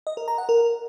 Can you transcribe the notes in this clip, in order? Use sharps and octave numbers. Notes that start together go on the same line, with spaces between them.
D#5
A#4
A#5
F#5
A#4